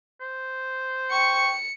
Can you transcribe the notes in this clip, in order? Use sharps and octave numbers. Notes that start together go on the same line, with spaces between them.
C5
G5 C#6 C#7